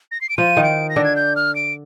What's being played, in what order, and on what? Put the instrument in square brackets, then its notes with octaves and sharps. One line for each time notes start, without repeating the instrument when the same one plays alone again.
[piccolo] A#6
C7
D7
[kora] F3 F4 [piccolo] D#7
[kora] D#3 D#4
[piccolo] D7
A#6
[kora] D3 D4
[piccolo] G#6
G6
F6
D7